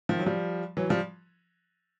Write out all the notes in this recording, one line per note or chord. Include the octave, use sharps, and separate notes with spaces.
D#3 F3
F#3
F3 G3
E3 F#3
F3 G3